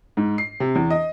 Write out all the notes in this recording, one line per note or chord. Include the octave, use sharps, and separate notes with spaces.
G#2
C7
C3
E2
D#5